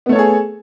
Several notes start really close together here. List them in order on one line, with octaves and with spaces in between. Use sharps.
B3 A3 C#5 A4 G#4